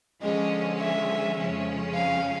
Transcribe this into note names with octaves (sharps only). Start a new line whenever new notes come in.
D3 F3 G#3 C#4 D#5
E5
F2 C#3 F3 G#3 C#4
F5